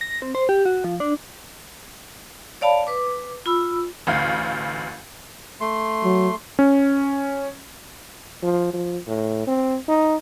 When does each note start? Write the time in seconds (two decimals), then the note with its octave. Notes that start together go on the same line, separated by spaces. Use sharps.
0.01 A#6
0.22 C4
0.35 C5
0.49 G4
0.65 F#4
0.84 F3
1.00 D4
2.61 C#5 D5 F5 A5 B5
2.87 B4 D6
3.46 F4 B5 E6
4.07 A1 D2 F5
5.61 A3 C6
6.04 F#3
6.59 C#4
8.43 F3
8.73 F3
9.07 A2
9.47 C4
9.88 D#4